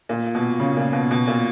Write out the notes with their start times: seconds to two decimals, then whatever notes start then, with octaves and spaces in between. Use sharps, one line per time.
0.09 A#2
0.35 B2
0.60 C#3
0.77 A#2
0.93 B2
1.11 B2
1.28 A#2